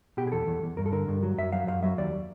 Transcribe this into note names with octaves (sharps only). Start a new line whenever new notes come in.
B2 G4
G#4
E2 A4
E2
E2
G2 A#4
A4
D3 A#4
G2
F#3
F#2 E5
F#3 F5
F#2 F5
F#3 E5
D#2 D5